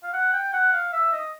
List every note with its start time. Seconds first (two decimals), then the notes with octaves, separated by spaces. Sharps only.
0.03 F5
0.13 F#5
0.33 G5
0.53 F#5
0.73 F5
0.92 E5
1.13 D#5